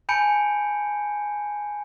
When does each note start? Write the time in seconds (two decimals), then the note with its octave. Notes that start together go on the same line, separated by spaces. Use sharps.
0.09 G#5 A5 B5 G6 C#7 D7